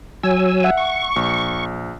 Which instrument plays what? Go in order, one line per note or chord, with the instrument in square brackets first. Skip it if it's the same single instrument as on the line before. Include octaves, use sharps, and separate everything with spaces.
[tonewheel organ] F#3 G#5 E6
[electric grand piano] E5 F#5
[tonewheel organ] C#6
[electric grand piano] A#1